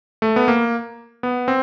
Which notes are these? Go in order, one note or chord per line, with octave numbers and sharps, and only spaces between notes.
A3
B3
A#3
B3
C4